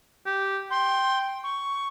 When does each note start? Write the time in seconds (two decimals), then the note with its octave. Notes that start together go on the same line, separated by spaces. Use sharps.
0.26 G4
0.71 G5 C6
1.43 C#6